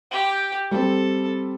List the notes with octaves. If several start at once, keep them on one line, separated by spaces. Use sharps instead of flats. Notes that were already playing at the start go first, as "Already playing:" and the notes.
G4 G5
G3 C4 A4